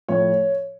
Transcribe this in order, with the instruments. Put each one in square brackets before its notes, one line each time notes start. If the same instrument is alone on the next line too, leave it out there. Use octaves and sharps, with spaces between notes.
[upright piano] A2 F3 C#5